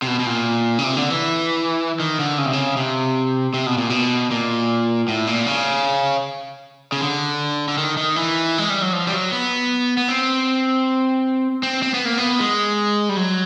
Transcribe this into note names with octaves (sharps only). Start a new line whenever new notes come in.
C3
B2
B2
A#2
C#3
C3
D3
E3
D#3
D3
C#3
C3
C#3
C3
C3
B2
A#2
B2
A#2
A2
A#2
C#3
C#3
D3
D3
D#3
D#3
E3
G#3
G3
F#3
F3
G3
F#3
B3
B3
C4
C4
C4
B3
A#3
B3
G#3
G3
F#3